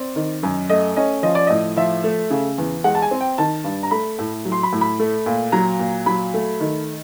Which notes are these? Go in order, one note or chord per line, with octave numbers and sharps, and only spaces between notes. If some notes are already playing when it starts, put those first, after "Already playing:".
Already playing: C4 D5
D#3
F#2
A3 D#5
C#4 D#5
F3 D#5
D5
A2 D#5
F3 E5
A3
C#3
E2
G#3 F#5
A5
G#5
C4
G5
D#3 A5
G2
A#5
A3 B5
A2
F#3
C6
B5
A2
B5
A3
A#2
F#3 A#5
A#2
F#3 B5
A3
D#3